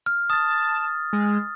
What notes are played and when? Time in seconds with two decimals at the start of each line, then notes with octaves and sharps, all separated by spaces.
0.06 F6
0.30 A5 D#6 A6
1.13 G#3